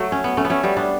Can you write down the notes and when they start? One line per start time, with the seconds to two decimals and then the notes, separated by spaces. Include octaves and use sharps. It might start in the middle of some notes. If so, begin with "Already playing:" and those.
Already playing: F#3 A3
0.12 C#4
0.24 B3
0.37 A3 C#4
0.45 B3
0.50 A3 C#4
0.63 G3 B3
0.76 B3 D4